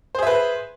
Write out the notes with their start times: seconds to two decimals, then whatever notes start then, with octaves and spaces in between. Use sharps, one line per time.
0.15 C5
0.19 G#4
0.23 E5
0.27 B4